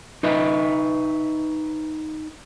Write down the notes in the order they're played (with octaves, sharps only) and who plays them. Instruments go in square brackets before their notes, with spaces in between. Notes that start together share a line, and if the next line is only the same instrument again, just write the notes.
[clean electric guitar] D#4 B4 D#5 E5